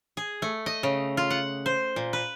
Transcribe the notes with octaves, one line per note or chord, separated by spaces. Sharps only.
G#4
A3
D#5
C#3
F4
F#5
C5
A#2
B4